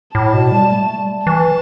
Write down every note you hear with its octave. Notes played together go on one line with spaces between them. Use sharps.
A2 A5
B2
G3
A3
G3
E3 A5